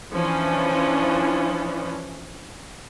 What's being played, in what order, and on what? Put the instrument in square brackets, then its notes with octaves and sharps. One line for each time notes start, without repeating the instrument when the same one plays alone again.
[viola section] E3 F3 C#4 D4